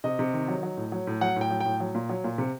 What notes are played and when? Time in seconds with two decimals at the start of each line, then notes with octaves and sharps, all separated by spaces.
0.04 C3 D#5
0.19 C3
0.34 D#3
0.48 F#3
0.63 F#3
0.77 A2
0.92 F#3
1.07 A2
1.21 F#3 F#5
1.36 A2 G5
1.51 F#3
1.60 A2 G5
1.80 F#3
1.95 A#2
2.09 F#3
2.24 A#2
2.38 C3